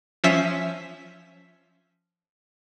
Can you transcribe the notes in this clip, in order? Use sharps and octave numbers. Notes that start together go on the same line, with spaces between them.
F3 C#4 E5 B6